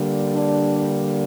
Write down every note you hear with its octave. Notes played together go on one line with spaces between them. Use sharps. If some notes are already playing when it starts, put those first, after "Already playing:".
Already playing: D3 G3 A#3
D4